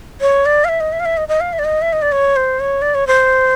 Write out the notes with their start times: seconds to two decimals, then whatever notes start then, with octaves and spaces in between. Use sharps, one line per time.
0.21 C#5
0.46 D5
0.65 F5
0.69 E5
0.80 D#5
0.92 E5
1.00 F5
1.05 E5
1.17 D#5
1.28 D#5
1.41 F5
1.53 E5
1.59 D5
1.64 D#5
1.82 E5
1.93 D#5
2.02 D5
2.12 C#5
2.36 C5
2.60 C#5
2.82 D5
2.95 C#5
3.07 C5